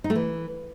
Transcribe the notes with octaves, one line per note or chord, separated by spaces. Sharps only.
D#4
A3
E3